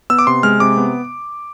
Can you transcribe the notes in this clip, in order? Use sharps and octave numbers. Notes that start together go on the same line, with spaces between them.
B3 E6
D6
C3 C6
G#3 F6
C3 D6
B3